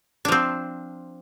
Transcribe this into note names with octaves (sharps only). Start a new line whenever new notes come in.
F3 C4 D4